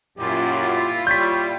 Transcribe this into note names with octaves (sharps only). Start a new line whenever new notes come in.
F#2 A#2 E4 F4 G4
G3 C#5 G6 B6